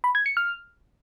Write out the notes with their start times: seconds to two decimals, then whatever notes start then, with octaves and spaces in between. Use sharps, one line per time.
0.04 B5
0.15 G#6
0.26 C#7
0.37 F6